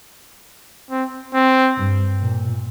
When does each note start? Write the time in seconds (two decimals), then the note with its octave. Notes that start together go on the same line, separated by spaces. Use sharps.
0.91 C4
1.34 C4
1.77 G2
2.21 A#2